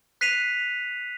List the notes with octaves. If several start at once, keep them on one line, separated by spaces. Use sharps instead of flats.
F#6 B6 C7 D#7 F7